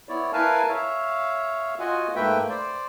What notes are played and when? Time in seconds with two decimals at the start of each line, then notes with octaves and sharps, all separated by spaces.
0.09 B3 E4 C#5 D5
0.33 E4 A#4 B4 F5 G#5 A5
0.69 C#5 E5 F5
1.80 F4 F#4 D#5 F#5 G#5
2.16 G#2 A3 A#3 B4 E5 G5
2.50 C5 D5